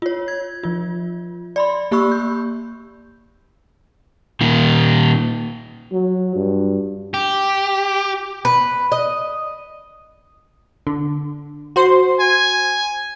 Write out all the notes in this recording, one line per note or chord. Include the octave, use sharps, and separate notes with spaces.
F4 C#5
G#6
F3 F4
D5 B5 C6
A#3 G4 B5 C#6 E6
G6
A#2 D#3
F#3
G2
G4
B4
D#5
D3
F#4 C5 C6
G#5